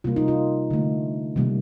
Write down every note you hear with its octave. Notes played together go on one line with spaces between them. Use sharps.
C3 G3 A#3 F4
D#4
F4
D3 A3
C3 D#3 G3 A#3